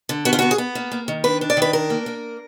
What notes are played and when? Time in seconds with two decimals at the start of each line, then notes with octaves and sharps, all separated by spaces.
0.09 D3
0.25 B3 F#4
0.33 F4
0.39 B3 F#4
0.51 G#4
0.58 B3
0.75 A#3
0.92 A#3
1.08 D#3
1.24 D4 B4
1.41 D4
1.50 D5
1.57 D#3 B4
1.73 D4 A#4
1.90 A#3
2.06 A#3